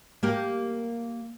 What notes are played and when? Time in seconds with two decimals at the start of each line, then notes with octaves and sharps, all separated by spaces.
0.23 A#3 G4 A#4